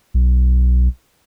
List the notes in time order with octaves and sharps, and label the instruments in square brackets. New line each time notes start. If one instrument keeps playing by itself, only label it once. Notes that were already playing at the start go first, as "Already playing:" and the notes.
[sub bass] B1